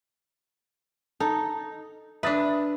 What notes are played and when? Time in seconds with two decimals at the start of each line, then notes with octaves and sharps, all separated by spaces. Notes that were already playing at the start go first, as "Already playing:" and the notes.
1.20 D#4 A4
2.23 D4 B4 E5 D#6 A6